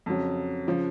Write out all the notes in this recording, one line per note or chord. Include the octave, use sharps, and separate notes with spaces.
F2 C#3 F#3
C#3 F3